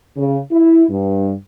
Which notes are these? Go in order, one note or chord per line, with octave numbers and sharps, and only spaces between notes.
C#3
E4
G2